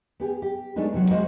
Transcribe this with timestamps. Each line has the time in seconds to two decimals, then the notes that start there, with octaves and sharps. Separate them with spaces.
0.20 B3 G4 G#4
0.42 G4
0.76 G#3 A3 B3 D4 D#4
0.93 E2 C3 F3 F#3
1.11 G#3 F#4 C5 D#5 F5